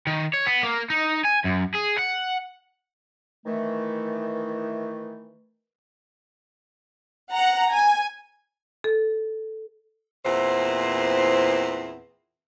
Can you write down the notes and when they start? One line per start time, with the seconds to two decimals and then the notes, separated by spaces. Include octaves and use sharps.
0.07 D#3
0.33 C#5
0.46 B3
0.63 A#3
0.90 D#4
1.24 G#5
1.44 F#2
1.74 G#4
1.98 F#5
3.45 D#3 E3 A3
7.32 F#5 A#5
7.71 G#5
8.84 A4
10.25 E2 A#2 B3 C4 E4 C5